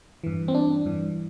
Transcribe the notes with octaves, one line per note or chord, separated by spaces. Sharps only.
G2 E3
C4
D4
G2 E3